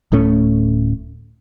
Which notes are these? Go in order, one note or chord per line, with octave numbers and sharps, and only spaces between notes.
D1 A2 A3 C#4